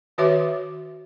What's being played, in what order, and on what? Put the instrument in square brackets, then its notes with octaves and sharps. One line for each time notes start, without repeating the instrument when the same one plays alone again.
[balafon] D#3 F#4 B4 C#5 E5 D6